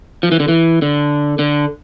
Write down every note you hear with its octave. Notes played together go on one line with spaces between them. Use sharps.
F3
E3
D3
E3
D3
D3